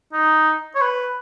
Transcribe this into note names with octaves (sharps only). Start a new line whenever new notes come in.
D#4
C#5
B4